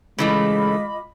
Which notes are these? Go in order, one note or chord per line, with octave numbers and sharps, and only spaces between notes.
C#3 E3 G#3 A3 F4 D#5 B5 D6